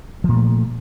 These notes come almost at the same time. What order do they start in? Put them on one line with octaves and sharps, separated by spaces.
F3 A#2 A3